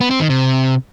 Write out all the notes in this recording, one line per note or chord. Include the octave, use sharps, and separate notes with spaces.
B3
C4
D#3
C3